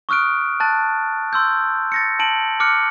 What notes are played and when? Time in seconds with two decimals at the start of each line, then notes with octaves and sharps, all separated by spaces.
0.09 C#6 D#6 F6 F#6 D7
0.60 A5 F#6 A6
1.33 C6 E6 G6
1.92 A6 A#6 C#7
2.19 A5 D7 F#7
2.60 D6 F6 F#6 C#7